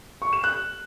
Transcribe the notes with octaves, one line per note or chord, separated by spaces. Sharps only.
C#6
E7
F#6